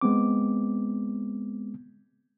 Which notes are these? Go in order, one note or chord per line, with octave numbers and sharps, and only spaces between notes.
G#3 B3 C4 D6